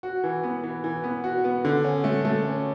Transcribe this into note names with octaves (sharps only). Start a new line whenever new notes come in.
F#4
E3
B3
E3
E3
B3
F#4
B3
D3
C#4
A3
A3
C#4